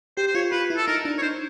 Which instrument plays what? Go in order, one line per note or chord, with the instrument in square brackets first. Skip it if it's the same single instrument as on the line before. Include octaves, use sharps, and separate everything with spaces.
[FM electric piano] G4 [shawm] C5
[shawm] C5
[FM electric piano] F4 [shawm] C#5
[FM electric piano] F4 [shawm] B4
[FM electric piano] E4
[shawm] A4
[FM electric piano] D#4 [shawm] A#4
[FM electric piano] D4
[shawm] C#5
[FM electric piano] D#4 [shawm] C5